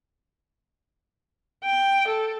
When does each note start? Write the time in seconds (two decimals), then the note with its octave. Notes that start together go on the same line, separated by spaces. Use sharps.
1.65 G5
2.08 A4